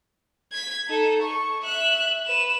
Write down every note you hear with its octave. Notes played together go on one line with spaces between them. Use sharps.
G#6 B6
D#4 A4
C#6
E5 F#6
B4 E7